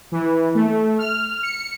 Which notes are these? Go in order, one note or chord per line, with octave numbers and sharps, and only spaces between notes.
E3
A3
F6
C#7